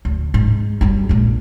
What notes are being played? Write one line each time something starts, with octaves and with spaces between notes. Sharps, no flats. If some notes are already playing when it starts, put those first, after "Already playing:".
D2
G#2
F#2 G3
A#1 G#3